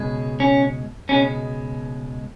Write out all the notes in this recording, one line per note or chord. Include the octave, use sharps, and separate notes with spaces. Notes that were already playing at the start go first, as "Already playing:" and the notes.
Already playing: C#2 B2 G#3
C#4
C#2 B2 G#3 C#4